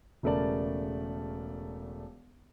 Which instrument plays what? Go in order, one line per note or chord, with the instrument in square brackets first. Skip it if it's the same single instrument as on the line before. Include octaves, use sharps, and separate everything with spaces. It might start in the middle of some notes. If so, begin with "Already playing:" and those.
[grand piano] E1 C#3 A3 A#4 D5 A5